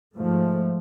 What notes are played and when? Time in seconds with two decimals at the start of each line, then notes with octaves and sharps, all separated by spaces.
0.15 G#2 F3 A3